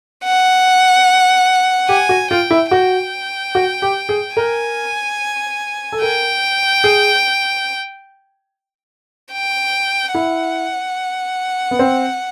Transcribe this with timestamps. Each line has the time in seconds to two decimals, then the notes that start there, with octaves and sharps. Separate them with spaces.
0.24 F#5
1.89 G4 G#5
2.09 F#4
2.30 F4 G5
2.51 E4
2.71 F#4 G5
3.55 F#4
3.82 G4
4.09 G#4
4.37 A#4 G#5
5.92 A4
6.02 A#4 G5
6.84 G#4
9.32 G5
10.15 E4 F#5
11.71 B3
11.79 C4